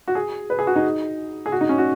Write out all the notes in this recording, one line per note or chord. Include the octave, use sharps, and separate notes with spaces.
F#4
G#4
B4
G#4
F#4
D#4
G#4
F#4
D#4
C#4
F#4